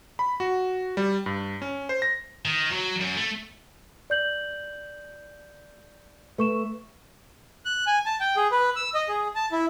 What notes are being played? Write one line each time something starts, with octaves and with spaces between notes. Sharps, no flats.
B5
F#4
G3
G2
C#4
C5
A#6
D#3
F#3
F#2
A3
D5 G6 F#7
A3 B4 C#6 E7
F#6
G#5
A5
G5
G#4
B4
E6
D#5
G#4
A5
E4